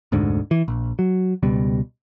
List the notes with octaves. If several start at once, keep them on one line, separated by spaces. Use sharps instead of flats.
F1 D2 G#2 D3
E3
A#1
F#3
C#2 B2 G3